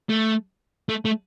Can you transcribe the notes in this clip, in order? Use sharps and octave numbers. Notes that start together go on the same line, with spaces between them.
A3
A3
A3